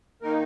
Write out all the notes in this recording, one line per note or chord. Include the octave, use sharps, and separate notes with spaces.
D#3 A#3 D#4 A#4